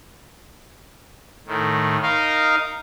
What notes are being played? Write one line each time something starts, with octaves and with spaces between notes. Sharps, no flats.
A2 D#3
D#4 A#4 D#5 F5